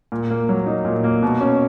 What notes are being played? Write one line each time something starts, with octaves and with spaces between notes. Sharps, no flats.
A#2
A#3
F#3
D#4
A#2
A#3
B2
C#4